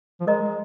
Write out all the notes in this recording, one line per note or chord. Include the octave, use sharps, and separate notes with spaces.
F3
G#3 A#4 D#5 A#5
G#3